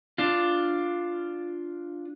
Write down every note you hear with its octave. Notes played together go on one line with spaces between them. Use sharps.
D4 F4